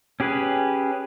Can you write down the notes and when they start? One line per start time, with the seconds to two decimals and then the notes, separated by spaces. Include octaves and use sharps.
0.20 C#4 G4 G#4 B4